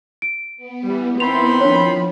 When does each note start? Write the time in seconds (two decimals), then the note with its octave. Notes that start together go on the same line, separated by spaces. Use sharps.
0.22 D7
0.56 B3
0.86 E3 G3
1.20 D#3 C4 E4 B5 C6 F7
1.61 F3 D4 C#5